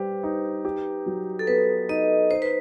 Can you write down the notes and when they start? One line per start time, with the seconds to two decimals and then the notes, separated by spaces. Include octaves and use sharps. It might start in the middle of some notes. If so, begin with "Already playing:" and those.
Already playing: G3 G4 B4 C5
0.23 D#4
0.65 G4
1.06 F#3
1.39 A4
1.47 B3 B4
1.89 D#4 D#5
2.31 D#4 C5
2.42 B4